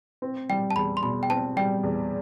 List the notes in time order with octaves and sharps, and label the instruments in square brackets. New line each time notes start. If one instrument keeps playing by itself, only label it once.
[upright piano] C4
[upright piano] G3 [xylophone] G5
[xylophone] A5
[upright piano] E2 [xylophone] B5
[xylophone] C6
[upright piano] B2 [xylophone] B5
[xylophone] G5
[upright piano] C4 [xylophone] A5
[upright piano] G3 [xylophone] G5
[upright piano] E2